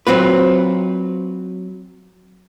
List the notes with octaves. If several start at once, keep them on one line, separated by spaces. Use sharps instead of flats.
F#3 C4 F4 B4